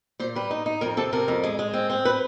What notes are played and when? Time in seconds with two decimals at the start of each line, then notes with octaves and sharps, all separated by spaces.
0.19 A#2 C5
0.35 G3 B4
0.51 D#4
0.66 D#4
0.81 F2 A#4
0.97 C3 A4
1.12 C3 A#4
1.28 F2
1.43 G#3
1.59 G#3
1.73 C4
1.90 C4
2.05 B4